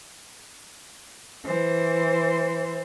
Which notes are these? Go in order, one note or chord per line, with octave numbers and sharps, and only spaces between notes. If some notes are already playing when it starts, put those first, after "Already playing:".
E3 C5